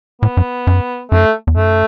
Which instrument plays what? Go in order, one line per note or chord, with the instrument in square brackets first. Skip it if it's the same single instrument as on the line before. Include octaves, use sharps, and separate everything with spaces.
[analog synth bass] A2 [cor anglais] B3
[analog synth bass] F#2
F#2
[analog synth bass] F#2 [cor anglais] A3
[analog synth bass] E2
[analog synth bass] F#2 [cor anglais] A3